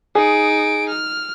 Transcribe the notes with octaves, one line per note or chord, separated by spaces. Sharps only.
D#4 G#4 D7
F6